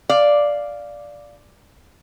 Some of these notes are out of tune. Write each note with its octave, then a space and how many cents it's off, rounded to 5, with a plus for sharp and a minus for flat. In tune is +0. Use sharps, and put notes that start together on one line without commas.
D5 +0 F5 +0